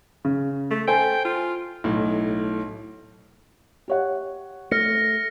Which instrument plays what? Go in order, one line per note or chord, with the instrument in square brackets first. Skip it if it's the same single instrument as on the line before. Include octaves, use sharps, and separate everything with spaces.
[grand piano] C#3
[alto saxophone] A3
[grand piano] A4 C5 G#5 [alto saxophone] G5
[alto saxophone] F4
[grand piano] B1 A2
[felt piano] G4 C#5 F#5
[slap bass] A3 [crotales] F6 A#6 C#7